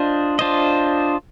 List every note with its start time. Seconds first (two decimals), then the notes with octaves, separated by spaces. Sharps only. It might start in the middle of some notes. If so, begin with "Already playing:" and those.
Already playing: D4 F4 C5 D#5
0.39 D4 F4 C5 D#5